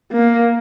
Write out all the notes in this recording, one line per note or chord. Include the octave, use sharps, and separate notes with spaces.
A#3